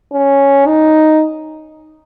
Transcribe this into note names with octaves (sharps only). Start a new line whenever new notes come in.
C#4
D#4